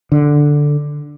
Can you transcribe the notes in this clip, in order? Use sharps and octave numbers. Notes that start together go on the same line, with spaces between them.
D3